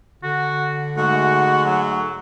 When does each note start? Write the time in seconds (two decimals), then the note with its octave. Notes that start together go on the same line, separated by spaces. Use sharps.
0.23 D3 F#4
0.97 G#2 G#3 A3 F#4 F#5
1.65 F#3